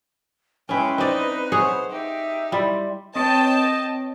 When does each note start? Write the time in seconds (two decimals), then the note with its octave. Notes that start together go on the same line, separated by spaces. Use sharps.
0.69 G#3 C#4 E4 B4 G5
0.98 C4 D#4 D5 D#5
1.52 G#4 C5 C#5 F#5
1.91 D#4 G4 E5
2.52 G3 E4 C6
3.16 C4 B4 C#5 D#5 G5 A5